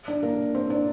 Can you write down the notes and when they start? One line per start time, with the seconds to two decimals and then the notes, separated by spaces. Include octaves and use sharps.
0.08 D4 D5
0.23 A#3 A#4
0.54 C4 C5
0.70 D4 D5